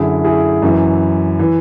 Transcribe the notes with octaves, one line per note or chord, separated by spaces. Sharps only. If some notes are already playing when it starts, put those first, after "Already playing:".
Already playing: F#2 D3 E4 G#4
E4 G#4
F#2 E3
E3